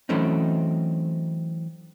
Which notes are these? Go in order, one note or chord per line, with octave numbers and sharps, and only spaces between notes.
E3 F#3 A3 C4 C#4 D#4